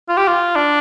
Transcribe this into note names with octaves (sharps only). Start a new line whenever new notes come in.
F4
G4
F4
D4